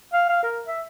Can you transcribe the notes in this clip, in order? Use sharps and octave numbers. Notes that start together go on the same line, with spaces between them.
F5
F5
A#4
E5